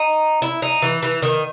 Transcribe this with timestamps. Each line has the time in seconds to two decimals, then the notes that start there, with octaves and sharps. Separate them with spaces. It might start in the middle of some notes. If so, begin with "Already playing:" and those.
Already playing: D#4
0.42 E4
0.62 D#4
0.82 E3
1.03 E3
1.22 D#3